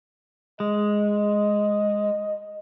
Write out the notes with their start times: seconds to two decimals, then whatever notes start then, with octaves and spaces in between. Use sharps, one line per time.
0.60 G#3 D#5